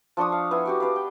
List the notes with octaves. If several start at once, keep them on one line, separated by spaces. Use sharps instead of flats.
F3 D4 C#5 D#6
F5
B3 E4 G#5
F#4 G4 D5
B4 D5 F5 B5
G5